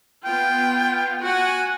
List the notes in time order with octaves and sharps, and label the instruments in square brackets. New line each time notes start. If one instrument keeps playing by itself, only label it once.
[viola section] B3 F4 [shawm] G5
[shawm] F#4 [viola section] F#5 G#5